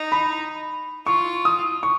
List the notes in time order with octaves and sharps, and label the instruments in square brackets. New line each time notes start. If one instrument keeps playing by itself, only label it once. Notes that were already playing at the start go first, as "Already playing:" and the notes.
Already playing: [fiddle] D#4
[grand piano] B5
[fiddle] F4 [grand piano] C#6
[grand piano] D#6
C#6